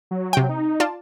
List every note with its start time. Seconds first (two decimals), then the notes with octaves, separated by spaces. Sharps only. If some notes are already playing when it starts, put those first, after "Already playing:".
0.11 F#3
0.33 C3 G5
0.49 D#4
0.80 F4 D5 A5